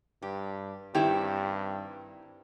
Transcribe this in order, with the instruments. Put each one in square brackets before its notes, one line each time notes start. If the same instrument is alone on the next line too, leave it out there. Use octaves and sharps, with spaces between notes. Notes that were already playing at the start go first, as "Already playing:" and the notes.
[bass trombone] G2 [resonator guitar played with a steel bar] G4
[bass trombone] G2 [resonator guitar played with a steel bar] D#3 C4 E4 [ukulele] G4